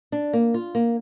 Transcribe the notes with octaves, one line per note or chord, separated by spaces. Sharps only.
D4
A#3
F4
A#3